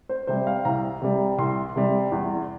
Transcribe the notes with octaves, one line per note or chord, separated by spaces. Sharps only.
C5
C3 G3 C5
F5
C2 A#5
C3 G3
C2 C6
C3 G3
E2